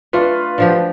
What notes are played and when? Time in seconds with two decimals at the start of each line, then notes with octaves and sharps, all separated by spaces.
0.13 A3 D4 F4 B4
0.58 D3 F3 G4